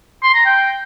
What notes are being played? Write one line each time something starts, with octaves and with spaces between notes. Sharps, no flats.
C6
A#5
G5